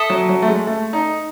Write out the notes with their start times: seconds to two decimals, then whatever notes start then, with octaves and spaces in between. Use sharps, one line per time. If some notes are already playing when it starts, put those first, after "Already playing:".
Already playing: A4 E5 A5 D#6
0.10 F#3
0.29 F#3
0.42 A3
0.48 G#3
0.67 A3
0.93 D#4